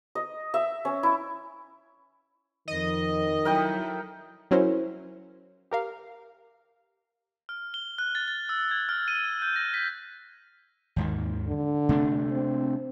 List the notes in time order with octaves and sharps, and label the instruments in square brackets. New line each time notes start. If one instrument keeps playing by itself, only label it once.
[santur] D#5
E5
C#4
E4
[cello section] F2 [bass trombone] D#3 [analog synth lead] D#5
[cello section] F#3 E4 A4 [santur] A#4 G5 D#6
[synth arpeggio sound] F#3 C#4 E4 A#4 C5
G4 A#4 F5
[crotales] F6
G7
F#6
A6
A6
E6
G#6
F6
D#7
G6
A#6
B6
[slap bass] D#2 G#2 D#3
[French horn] D3
[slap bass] C3 A3 D4
[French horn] C4